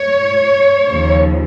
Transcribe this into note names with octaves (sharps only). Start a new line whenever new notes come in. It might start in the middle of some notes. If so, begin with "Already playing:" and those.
Already playing: C#5
D#2 C#3 F3